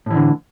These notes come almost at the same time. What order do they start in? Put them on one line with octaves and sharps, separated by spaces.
A2 E3 D3